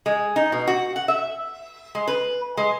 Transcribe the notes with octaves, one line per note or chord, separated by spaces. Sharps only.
G#3
D#4
B2
F#4
F#5
E5
G#3
B4
G#3